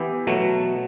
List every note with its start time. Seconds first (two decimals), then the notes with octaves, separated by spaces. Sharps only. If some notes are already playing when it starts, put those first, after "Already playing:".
Already playing: E3 B3 E4 G4
0.27 B2 F#3 A3